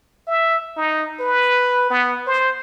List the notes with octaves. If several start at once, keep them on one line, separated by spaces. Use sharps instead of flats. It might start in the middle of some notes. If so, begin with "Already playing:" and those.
E5
D#4
B4
B3
C5